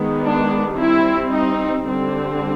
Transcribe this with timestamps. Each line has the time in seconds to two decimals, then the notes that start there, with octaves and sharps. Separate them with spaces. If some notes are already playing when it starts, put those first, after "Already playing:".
Already playing: D#3 G#3 B3
0.23 D4
0.77 G3 C4 E4
1.31 D#4
1.85 D3 G3 C4